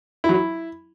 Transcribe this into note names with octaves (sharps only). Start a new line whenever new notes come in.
E4
F#3
E4